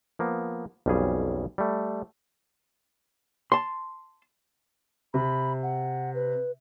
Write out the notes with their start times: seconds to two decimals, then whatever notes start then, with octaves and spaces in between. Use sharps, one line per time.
0.19 F3 A#3 B3
0.86 B1 F2 G3 C#4 G#4
1.58 G3 A3
3.52 A5 C6
5.14 C3 B5
5.63 F#5
6.14 B4